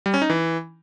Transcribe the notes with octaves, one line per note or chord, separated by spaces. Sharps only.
G3
C#4
D#4
E3